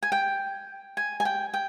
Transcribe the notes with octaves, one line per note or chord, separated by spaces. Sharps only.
G#5
G5
G#5
G#5
G5
G5